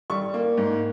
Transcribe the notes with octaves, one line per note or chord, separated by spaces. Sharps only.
G3 C#6
A#3
G#2